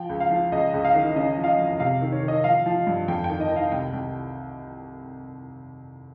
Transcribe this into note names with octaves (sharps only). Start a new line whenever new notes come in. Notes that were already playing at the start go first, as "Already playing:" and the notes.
Already playing: F3 G5
C#2
F5
F3
C#2 D#5
C#2
F5
D#3
C#3 D#5
F3
F5
D#5
F2
C3 F5
D#3
C#5
D#3
D#5
F3 F5
F3
G2
F2 G5
D#3 G5
D#5
D#3
F5
C2 G5
C2